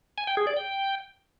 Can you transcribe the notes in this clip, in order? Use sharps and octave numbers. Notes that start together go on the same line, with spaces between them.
G#5
G5
G#4
D5
G5